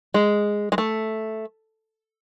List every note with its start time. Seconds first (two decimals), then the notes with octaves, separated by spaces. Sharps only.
0.14 G#3
0.72 G#3
0.78 A3